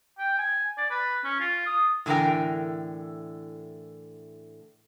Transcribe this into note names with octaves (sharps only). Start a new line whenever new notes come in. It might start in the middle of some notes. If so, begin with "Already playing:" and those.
G5
G#5
D5
B4
C#4
F4
D#6
A2 D3 E3 A4 A#4 G5